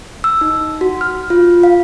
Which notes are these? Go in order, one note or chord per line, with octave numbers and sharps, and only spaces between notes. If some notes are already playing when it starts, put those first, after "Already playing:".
E6
D#4
F#4
F6
F4
F5